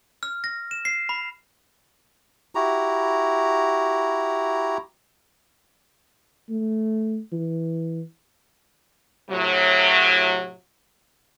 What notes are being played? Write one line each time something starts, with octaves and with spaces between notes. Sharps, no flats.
F6
A#6
E7
C7
B5
E4 F#4 G4 A#5
A3
E3
A2 C3 F#3